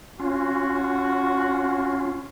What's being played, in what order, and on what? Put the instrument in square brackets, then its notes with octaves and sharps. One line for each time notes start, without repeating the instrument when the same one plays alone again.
[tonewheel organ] C#4 F4 [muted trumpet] F#4